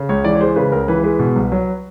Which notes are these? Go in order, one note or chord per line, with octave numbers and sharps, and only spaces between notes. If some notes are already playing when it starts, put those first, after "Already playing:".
Already playing: C#3
C#2 C#5
E3 D5
C#5
G#3 C5
C#3 B4
C#2 A#4
E3 B4
G#3 B4
B2
C2
F#3